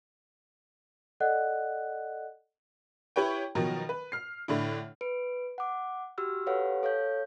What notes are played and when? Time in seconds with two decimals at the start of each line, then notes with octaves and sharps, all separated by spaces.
1.20 A4 D5 D#5 F#5 F#6
3.16 E4 G4 B4 C#5 G5
3.55 B2 D#3 F3 F#3 A#4
3.89 B4
4.12 F6 C7
4.48 A2 D3 D4 E4
5.01 B4 D7
5.58 F#5 D6
6.18 F#4 G4 E6 F6
6.46 G4 A4 B4 C#5 F5 F#5
6.83 A4 C#5 F5 G6